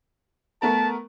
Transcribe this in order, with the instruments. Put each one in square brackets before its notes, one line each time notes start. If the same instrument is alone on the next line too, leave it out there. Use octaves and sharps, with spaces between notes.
[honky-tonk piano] A3 B3 A#4 [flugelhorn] A5